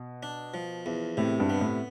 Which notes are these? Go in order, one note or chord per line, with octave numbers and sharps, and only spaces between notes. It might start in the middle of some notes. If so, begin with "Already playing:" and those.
Already playing: B2
D4
F3
E2
A2 C3
G2
B3
A2